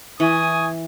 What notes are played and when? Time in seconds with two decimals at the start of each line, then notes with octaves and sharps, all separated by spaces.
0.20 E3 G#5 C#6 D#6